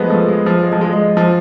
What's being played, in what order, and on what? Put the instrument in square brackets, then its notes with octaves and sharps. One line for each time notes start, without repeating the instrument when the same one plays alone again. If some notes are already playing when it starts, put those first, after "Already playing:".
Already playing: [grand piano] F3 G#3 A3 B3
F3 A3
G#3
F3
G#3
F3
G#3
G#3
F3